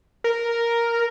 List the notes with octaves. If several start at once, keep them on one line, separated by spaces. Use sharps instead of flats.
A#4